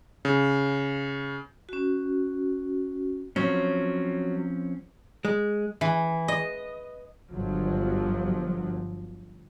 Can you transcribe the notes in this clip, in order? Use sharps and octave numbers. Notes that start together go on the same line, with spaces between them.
C#3
C#4 F#4
F3 F#3 C4 C#4
G#3
E3
D#5
G1 F3 F#3